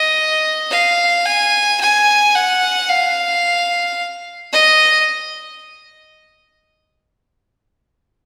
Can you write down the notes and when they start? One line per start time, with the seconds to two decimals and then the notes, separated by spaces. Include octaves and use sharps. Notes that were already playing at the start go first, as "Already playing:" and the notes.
Already playing: D#5
0.71 F5
1.26 G#5
1.81 G#5
2.35 F#5
2.89 F5
4.53 D#5